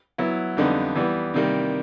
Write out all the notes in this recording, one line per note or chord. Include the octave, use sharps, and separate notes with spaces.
F#3 B3 E4
F2 D3 G3 B3 D#4
E3 G3 B3
C3 D#3 G3 A#3